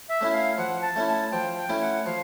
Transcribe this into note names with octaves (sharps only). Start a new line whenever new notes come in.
E5
A3 C#4 E4
F5
F3 F#5
A5
A3 C#4 E4
A5
F3 G5
G5
A3 C#4 E4
F#5
F3 F5